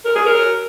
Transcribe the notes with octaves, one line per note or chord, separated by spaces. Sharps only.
A#4
G#4
A#4